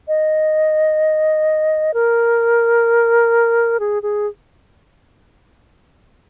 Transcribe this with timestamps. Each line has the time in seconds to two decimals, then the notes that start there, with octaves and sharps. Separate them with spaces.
0.08 D#5
1.94 A#4
3.80 G#4
4.03 G#4